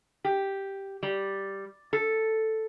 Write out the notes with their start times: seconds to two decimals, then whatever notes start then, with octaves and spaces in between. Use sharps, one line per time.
0.24 G4
1.03 G3
1.93 A4